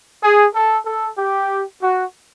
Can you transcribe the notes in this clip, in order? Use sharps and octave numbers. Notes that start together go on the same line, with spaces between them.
G#4
A4
A4
G4
F#4